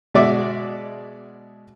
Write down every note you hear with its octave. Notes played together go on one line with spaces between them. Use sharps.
B2 G#3 F#4 D5 E5 D6